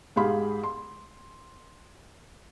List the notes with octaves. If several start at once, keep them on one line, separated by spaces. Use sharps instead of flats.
G#2 G4 G#4 F5 B5
C6